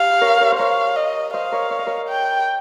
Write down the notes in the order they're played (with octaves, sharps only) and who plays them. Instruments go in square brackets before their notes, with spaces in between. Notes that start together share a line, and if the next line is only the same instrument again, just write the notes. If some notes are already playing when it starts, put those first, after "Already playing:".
Already playing: [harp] G4 [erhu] F5
[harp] A#4 C#5
A#4 C#5
C5
[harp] A#4 C#5 [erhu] F5
[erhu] D#5
[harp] C5 D#5 [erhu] F5
[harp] A#4 C#5
C#5
D#5
A#4 C#5
[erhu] G5